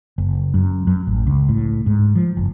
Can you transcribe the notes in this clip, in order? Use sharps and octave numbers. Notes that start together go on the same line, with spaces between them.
F#1
F#2
F#2
A1
C#2
A2
G#2
F3
F#1